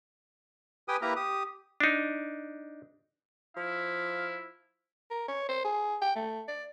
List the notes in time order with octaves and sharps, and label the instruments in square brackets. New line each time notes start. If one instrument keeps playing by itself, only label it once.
[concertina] G4 B4 G5 G#5 D#6
A#3 E4 G4 A#4 B4 A#5
G4 D#6
[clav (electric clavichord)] D4 D#4
[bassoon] F3 [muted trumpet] E4 [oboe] F5
[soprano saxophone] A#4
C#5
C5
G#4
G5
A3
D5